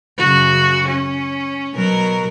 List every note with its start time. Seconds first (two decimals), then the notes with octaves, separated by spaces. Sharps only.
0.18 F#2 C#3 F#4
0.87 C#4
1.74 B2 F#3 A#4